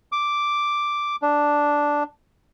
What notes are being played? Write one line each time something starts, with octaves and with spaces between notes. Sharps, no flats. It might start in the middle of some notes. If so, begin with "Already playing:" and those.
D6
D4